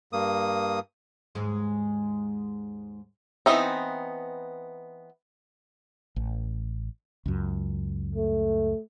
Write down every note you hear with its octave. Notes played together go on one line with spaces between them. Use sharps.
G2 A#3 D#6
D#2 G#2 G#3
E3 B3 C4 D#4
A1
C#2 F#2
A3